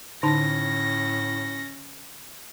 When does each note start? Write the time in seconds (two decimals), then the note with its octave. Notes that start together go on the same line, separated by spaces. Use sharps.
0.23 A2 D3 C#4 D#4 A5 A#6